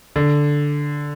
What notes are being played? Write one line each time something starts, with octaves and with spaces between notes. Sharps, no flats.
D3